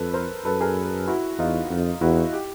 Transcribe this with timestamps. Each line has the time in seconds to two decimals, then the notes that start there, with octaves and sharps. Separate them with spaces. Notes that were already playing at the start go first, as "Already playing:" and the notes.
Already playing: F2 A4 B4
0.13 A#4 C5
0.45 F#2 A4 B4
0.61 G#4 A#4
1.08 E4 F#4
1.39 E2 D#4 F4
1.70 F2
2.01 E2 E4 F#4
2.33 G4